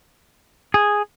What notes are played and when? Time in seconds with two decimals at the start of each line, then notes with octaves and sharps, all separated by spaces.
0.74 G#4